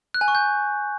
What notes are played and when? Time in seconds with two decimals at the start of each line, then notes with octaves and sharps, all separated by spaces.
0.14 F#6
0.21 G#5
0.28 C#6
0.35 G6